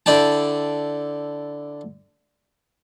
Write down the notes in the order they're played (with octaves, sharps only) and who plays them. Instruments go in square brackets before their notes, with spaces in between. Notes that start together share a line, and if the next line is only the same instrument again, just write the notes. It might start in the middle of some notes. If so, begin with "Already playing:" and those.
[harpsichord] D3 E4 D5 G5 A5